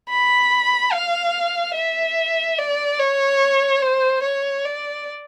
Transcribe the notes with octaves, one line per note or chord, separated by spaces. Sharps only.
B5
F5
E5
D5
C#5
C5
C#5
D5